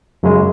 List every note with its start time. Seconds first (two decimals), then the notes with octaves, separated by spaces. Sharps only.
0.23 F#2 C#3 G#3